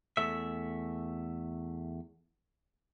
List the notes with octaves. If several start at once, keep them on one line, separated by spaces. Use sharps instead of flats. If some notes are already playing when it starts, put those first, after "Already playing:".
E2 A3 E5